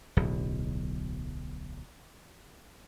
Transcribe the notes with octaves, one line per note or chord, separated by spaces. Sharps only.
D1 B1 B2